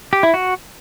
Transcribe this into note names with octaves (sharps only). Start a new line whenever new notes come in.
G4
E4
F#4